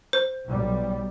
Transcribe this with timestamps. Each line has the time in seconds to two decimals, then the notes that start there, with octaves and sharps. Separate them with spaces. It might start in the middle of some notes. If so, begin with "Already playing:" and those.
0.13 C5
0.48 B1 G3